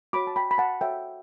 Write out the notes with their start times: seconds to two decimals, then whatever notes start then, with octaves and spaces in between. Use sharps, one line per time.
0.13 F#4 C#5 B5 D6
0.27 A5
0.36 G5 B5
0.51 B5
0.58 F#5 A5
0.81 F#4 A4 C#5 E5 G5